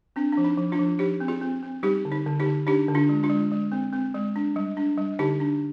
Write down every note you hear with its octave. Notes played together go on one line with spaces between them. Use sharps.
C4 D4
F3 D4
D#4
F3
D4 F4
F3
F3 D#4 G4
C4
F4 G#4
C4
C4
G3 D#4 G4
D3
D#4
D3
D#4 G4
D3
D4 D#4 G4
D3
D4 F4
G#3
D4 F4
G#3
G#3
C4
C4
G#3
D4
G3
D4
G3
D3 D#4 G4
D4